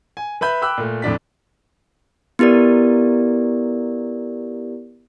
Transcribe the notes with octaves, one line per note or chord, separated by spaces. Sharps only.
G#5
B4 E5 B5 G6
G5 B5 D6 E6 F#6
A#2 A3
F2 A2 D4 B6
B3 E4 G4 A#4 D5